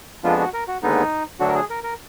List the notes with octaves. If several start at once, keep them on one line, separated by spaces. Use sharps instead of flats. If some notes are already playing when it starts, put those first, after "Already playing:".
F2 F3 G#3 B3 D4 F4
F#4
A#4
F#4
D#2 D3 G#3 B3 D#4
D2 D3 F#3 D4 F#4
A#4
G#4
A#4
A#4